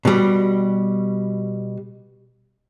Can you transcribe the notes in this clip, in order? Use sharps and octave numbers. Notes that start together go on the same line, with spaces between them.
B2 G3